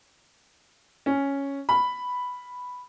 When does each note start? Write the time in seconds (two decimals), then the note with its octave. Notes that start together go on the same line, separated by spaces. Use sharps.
1.06 C#4
1.69 B5